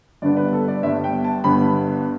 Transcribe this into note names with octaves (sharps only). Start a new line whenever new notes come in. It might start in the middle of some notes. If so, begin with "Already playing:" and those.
G1 G2 D3 B3 D5
B4
A4
D5
G1 G2 D3 B3 E5
G5
A5
G1 G2 D3 B3 B5